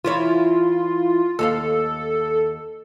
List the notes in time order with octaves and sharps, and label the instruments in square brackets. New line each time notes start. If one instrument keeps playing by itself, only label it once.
[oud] E3 E4 C#5 [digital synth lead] F4
[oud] D#2 G4 F5 [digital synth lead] A4